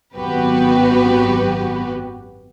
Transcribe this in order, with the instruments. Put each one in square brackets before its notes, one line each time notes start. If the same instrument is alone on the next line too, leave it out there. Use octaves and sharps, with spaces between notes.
[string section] G#1 F#2 B3 F#4 G4 B4